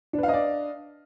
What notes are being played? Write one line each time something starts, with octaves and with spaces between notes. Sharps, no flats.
D4 B4 D5 D#5 F5